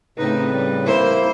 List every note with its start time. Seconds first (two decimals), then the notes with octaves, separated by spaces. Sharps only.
0.18 A2 C#3 A3 C4 D#4 B4
0.51 G3
0.86 A#3 E4 C5